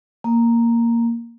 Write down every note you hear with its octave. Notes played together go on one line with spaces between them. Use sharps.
A#3